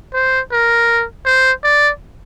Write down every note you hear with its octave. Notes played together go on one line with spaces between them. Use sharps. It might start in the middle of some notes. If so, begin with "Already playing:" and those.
C5
A#4
C5
D5